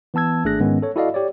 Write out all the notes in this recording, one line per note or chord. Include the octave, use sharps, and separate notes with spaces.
E3 B3 A5 E6 G#6
G#1 A3 D4 G#4 F#6 A#6
G#2 D#3 G#3 B3 C#4
A4 C#5
E4 F#4 A4 D5 D#5 F5
G4 C#5 D5